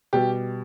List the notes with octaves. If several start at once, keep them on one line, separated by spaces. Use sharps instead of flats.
B2 G3 G4